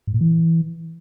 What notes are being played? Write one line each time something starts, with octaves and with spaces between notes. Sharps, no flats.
G#2
A#2
E3